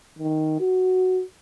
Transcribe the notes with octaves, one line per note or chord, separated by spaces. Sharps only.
D#3
F#4